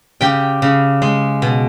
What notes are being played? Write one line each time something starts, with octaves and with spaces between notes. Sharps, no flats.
C#3 G4 G5
C#3
G#3
B2